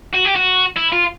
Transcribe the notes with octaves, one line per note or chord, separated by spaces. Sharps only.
F#4
G4
F#4
E4
F4